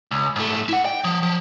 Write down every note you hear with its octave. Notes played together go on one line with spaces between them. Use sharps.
C#2
G#2 A3
E4 F#5
G5
F3
F3